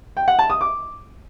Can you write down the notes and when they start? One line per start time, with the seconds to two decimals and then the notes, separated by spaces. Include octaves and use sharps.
0.17 G5
0.28 F#5
0.39 A5
0.50 D#6
0.61 D6